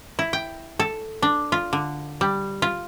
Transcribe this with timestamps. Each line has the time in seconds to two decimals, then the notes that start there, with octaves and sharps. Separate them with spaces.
0.19 E4
0.33 G5
0.79 A4
1.22 D4
1.52 F4
1.73 D3
2.21 G3
2.62 F4